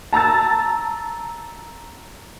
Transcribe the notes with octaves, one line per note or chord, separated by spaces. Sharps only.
A5 A#5 E6 A6